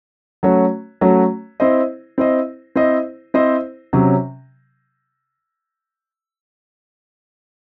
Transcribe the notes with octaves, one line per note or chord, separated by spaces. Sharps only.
F#3 A3 C#4 F#4 C#5
F#3 A3 C#4 F#4 C#5
C4 E4 C5 D#5
C4 E4 C5 D#5
C4 E4 C5 D#5
C4 E4 C5 D#5
C3 F#3 C#4